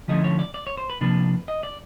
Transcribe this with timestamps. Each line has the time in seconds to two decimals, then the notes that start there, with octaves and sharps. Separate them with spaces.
0.08 D3 F3 A3 C#4 E4 D#5
0.24 C#5
0.39 D5
0.54 D5
0.67 C#5
0.77 C5
0.90 B4
1.01 C3 F3 A#3 D4 B4
1.48 D#5
1.63 D5